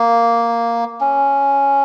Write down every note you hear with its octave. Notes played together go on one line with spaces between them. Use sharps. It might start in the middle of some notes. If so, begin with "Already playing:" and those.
Already playing: A#3
C#4